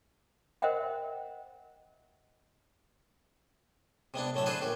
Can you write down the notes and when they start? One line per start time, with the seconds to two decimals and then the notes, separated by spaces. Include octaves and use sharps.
0.62 A#4 C5 D#5 E5 F#5 G5
4.14 C3 G#3 B3 D4
4.35 A2 F#3 A3 E5
4.46 D3 D4 F#4 G#4 B4 C5
4.61 A#1 F#4 G4